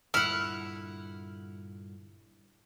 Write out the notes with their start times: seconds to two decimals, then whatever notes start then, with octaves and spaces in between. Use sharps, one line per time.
0.14 G2 A#2 D3 E4 F#5 F6